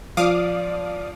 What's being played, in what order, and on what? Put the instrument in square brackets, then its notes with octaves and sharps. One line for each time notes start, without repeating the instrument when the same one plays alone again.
[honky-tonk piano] F3 [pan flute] D5 [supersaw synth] F5 D6 D#6